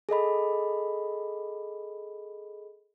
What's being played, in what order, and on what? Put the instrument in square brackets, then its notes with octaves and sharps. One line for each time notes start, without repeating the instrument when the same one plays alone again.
[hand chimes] G#4 A4 D#5 B5